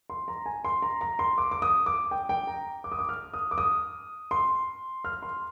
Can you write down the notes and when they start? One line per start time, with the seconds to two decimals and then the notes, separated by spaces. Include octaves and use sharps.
0.10 C6
0.28 A#5
0.46 G#5
0.65 C6
0.82 A#5
1.01 A#5
1.19 C6
1.38 D6
1.52 D6
1.62 D#6
1.86 D6
2.11 G5
2.29 G5
2.47 A#5
2.84 D6
2.92 D#6
2.99 D6
3.09 F6
3.34 D#6
3.51 D6
3.58 D#6
4.31 C6
5.05 F6
5.23 C6